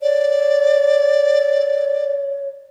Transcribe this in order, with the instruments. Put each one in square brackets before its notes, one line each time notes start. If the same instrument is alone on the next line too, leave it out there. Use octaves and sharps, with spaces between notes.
[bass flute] C#5 [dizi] D5